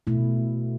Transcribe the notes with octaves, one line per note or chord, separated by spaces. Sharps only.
B2 A3 E4